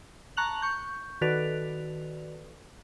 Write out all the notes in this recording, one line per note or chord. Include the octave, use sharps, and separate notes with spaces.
A5 A#5 C#6 F#6 F7 F#7
C#6 G6
D#3 F#4 A4 B4 D5 F7